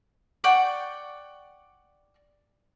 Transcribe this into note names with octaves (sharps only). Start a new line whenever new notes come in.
D5 F#5 G5 C#6